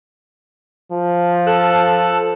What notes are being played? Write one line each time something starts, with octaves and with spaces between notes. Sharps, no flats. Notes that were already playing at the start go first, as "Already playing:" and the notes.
F3
A4 E6 F#6